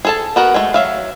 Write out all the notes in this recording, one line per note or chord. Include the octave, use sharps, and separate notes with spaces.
G#4 A4 A5
B3 F#4 A#4
G#3 A3
F#3 E5 F5